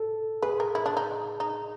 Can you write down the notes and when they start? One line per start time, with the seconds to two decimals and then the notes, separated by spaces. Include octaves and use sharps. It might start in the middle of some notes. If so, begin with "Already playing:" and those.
Already playing: A4
0.42 G#4 B4
0.60 A#4
0.75 E4
0.86 D4
0.97 D#4
1.40 D#4